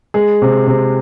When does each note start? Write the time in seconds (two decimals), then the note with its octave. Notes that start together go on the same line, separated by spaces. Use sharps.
0.14 G#3 G#4
0.42 C3
0.67 C3